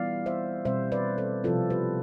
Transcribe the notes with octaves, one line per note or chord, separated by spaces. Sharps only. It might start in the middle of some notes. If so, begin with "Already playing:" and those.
Already playing: E3 G3 B3 E4 D5 F5
C5 E5
B2 G3 C4 C5 E5
B4 D5
A4 C5
C3 F3 C4 E4 F4 A4
G4 B4